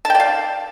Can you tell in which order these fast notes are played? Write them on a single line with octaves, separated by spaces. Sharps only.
A5 G5 D5 F5